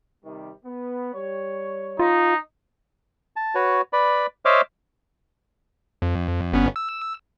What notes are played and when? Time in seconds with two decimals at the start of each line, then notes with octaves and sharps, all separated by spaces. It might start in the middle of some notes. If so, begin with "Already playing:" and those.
0.24 C3 D#3 G3
0.64 B3
1.13 G3 C#5
1.99 D#4 F4
3.36 A5
3.55 F#4 B4 C#5
3.93 B4 D5 B5
4.45 C5 C#5 D#5 E5 D6 F6
6.02 F2
6.53 G1 B3 C#4
6.76 E6